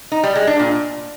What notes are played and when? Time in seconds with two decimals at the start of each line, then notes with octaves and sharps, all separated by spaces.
0.12 D#4
0.23 G3
0.35 G#3
0.47 D4
0.59 A#2